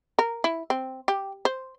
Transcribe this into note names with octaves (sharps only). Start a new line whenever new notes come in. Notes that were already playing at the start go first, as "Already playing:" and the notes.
A#4
E4
C4
G4
C5